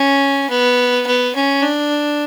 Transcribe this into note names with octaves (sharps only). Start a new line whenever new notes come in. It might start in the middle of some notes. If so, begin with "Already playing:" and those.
Already playing: C#4
B3
B3
C#4
D4